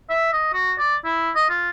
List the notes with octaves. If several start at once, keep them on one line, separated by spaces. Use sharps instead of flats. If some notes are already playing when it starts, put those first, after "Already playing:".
E5
D#5
F#4
D5
E4
D#5
F4